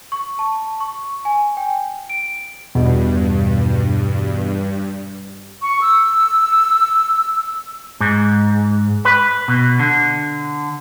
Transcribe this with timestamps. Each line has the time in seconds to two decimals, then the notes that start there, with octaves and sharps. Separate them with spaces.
0.12 C#6
0.39 A5
0.80 C#6
1.25 G#5
1.57 G5
2.10 D7
2.75 E2 G2 B2
5.62 C#6
5.81 E6
8.00 G#2
9.05 B4
9.48 B2
9.79 D3